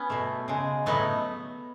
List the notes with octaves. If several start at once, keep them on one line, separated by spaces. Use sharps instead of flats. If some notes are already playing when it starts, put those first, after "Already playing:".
Already playing: B3 C#4
B2 A3
C#3 G#3
A2 F#3 A3 B3 D#4